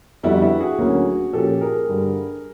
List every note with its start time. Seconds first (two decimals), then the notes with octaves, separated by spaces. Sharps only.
0.23 F2 D3 G3 B3 E4 F#4
0.42 E4 F#4
0.60 F#4 G#4
0.78 D2 D3 F#3 A#3 C#4
1.33 A#2 F3 A#3 C#4 G4 A4
1.61 G#4 A#4
1.88 G2 D3 G3